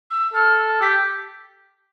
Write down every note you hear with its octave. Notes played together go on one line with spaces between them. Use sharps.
E6
A4 F6
G4 B6